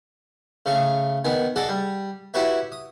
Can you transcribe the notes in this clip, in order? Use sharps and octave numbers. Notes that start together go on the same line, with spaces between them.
C#3 A3 C#6
D#3 B3 G#5
G#4 A4 D5 D#5 F#5
G3
E4 F#4 G4 B4 C#5 E5
D#6